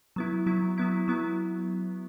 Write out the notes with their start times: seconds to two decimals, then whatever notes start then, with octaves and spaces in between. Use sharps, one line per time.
0.16 F#3 B3 E4
0.46 F#3 B3 E4
0.78 F#3 B3 E4
1.08 F#3 B3 E4